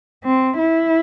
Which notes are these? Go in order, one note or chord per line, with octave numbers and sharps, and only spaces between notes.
C4
E4